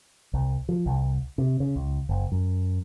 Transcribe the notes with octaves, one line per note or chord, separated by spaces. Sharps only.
C2
F3
C2
C3
C#3
C#2
F#1
F#2